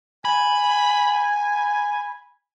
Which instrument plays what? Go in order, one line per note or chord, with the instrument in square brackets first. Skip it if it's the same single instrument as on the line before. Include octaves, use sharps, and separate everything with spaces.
[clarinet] G#5 [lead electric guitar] B5